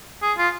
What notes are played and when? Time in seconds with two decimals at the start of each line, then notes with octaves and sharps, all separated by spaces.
0.22 G#4
0.38 F4